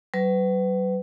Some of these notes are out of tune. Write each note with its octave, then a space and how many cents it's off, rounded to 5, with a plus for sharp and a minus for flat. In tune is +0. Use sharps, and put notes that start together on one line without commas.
F#3 +40 B4 +30